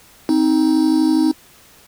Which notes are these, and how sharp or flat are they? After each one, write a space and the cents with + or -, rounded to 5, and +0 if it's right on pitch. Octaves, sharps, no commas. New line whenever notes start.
C4 +0 D#4 +15